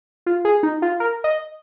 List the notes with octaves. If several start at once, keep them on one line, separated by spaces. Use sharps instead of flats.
F4
G#4
D#4
F4
A#4
D#5